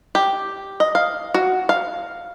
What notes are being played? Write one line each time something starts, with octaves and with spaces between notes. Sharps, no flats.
G4
D#5
F5
F#4
F5